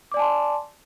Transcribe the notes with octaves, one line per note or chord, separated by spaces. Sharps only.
D5 G#5 A5 C6 D6